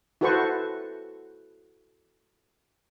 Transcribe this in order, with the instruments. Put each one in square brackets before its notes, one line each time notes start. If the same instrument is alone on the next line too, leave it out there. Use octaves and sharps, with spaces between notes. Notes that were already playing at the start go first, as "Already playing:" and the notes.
[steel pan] E4 F#4 A4 B4 C5 C#6